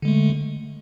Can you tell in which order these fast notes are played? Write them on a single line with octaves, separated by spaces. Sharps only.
D3 G#3 A3